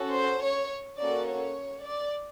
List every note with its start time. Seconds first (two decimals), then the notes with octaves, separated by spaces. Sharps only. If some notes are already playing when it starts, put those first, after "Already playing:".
Already playing: C#4 F#4 A4
0.15 C5
0.44 C#5
0.99 A#3 C#4 F#4 A4 D5
1.28 C#5
1.84 D5